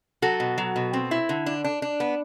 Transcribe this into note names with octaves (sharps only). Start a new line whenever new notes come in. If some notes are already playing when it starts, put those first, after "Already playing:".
F#3 F#4 A4
B2
F#3
B2
C4
E4
D3
D4
D4
D4
B3